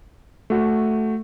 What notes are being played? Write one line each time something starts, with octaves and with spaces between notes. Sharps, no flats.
A3 F#4